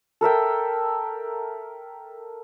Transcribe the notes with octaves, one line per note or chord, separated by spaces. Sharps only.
A4 A#4 E5 G5